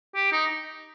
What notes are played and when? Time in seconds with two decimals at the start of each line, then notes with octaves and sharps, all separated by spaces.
0.15 G4
0.32 D#4